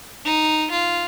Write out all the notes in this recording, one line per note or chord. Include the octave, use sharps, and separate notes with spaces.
D#4
F4